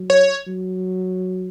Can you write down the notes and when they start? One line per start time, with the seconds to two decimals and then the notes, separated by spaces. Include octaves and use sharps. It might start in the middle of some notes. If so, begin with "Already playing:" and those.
Already playing: F#3
0.10 C#5
0.47 F#3